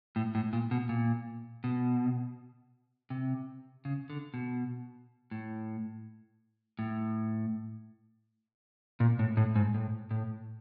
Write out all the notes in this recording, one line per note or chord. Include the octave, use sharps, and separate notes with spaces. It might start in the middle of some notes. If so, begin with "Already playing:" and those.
A2
A2
A#2
B2
A#2
B2
C3
C#3
D3
B2
A2
A2
A#2
A2
A2
G#2
A2
A2